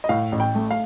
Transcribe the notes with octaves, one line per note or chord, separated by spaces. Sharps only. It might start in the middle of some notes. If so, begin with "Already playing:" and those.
D#5
A2 F5
A1
G5
A3
F5